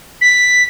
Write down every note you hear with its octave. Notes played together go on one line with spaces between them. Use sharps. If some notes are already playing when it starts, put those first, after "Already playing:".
B6